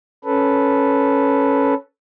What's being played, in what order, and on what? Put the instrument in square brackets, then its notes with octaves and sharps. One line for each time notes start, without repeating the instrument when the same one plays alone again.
[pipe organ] C#4 A4 B4